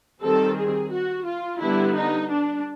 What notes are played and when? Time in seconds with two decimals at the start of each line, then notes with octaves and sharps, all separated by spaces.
0.22 D#3 G3 C4 A4
0.56 G#4
0.92 F#4
1.26 F4
1.61 D3 G3 B3 E4
1.95 D#4
2.29 D4